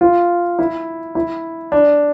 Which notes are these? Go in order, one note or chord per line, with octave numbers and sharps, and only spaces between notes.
F4
E4
E4
D4